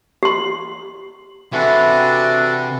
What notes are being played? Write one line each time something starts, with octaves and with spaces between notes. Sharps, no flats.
G4 C6
C3 E3 D4 F#4 A4